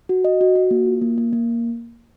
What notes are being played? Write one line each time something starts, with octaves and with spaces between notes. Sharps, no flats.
F#4
D#5
F#4
F#4
A#3
F4
A#3
A#3
A#3